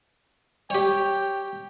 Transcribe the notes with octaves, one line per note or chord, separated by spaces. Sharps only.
G4 C#5 G5